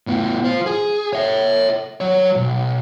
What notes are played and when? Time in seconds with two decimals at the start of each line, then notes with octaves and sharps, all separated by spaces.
0.07 A2 B3
0.45 F4 C5
0.66 G#4
1.13 C#5 E5
2.00 F#3 C#5
2.36 B1